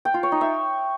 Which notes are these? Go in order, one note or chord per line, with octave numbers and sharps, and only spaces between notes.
G5
F4
C#5
D#4
E5